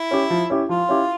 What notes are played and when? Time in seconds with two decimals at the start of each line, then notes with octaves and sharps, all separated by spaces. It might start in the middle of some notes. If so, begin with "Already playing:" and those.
Already playing: E4
0.11 C#4 G4
0.30 F3
0.50 C#4 E4 G4
0.69 F3 F4
0.89 C#4 E4 G4